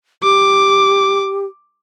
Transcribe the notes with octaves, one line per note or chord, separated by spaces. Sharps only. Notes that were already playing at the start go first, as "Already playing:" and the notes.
G4 D6